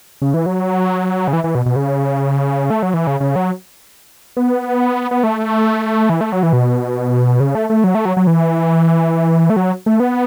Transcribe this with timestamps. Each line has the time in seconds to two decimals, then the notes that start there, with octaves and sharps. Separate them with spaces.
0.22 C#3
0.34 E3
0.46 F#3
1.28 C#3
1.33 E3
1.44 E3
1.55 B2
1.66 B2
1.76 C#3
2.70 A3
2.83 F#3
2.94 E3
3.07 C#3
3.20 C#3
3.36 F#3
4.37 B3
5.11 B3
5.24 A3
6.10 E3
6.21 A3
6.32 F#3
6.43 E3
6.53 B2
7.40 C#3
7.55 A3
7.70 A3
7.84 F#3
7.95 A3
8.05 F#3
8.17 F#3
8.27 E3
9.50 A3
9.56 F#3
9.86 A3
10.00 B3